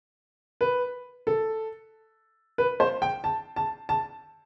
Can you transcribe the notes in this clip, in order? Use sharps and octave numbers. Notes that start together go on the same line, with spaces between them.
B4
A4
B4
C5
G5
A5
A5
A5